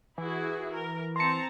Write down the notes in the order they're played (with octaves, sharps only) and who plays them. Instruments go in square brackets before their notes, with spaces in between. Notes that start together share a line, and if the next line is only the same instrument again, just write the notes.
[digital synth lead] E3 [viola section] E4 F#4 G#4
[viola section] A#4
[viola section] C4 A5 A#5 [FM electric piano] C6 C#7